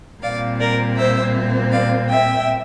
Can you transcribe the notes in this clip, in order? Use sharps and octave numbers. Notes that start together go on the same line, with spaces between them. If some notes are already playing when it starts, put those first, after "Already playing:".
A#2 G3 C4 D5 F5
A#4 D5
C5 E5
D5 F5
E5 G5